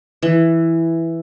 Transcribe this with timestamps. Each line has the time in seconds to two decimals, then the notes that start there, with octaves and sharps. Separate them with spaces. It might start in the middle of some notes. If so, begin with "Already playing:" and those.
0.23 E3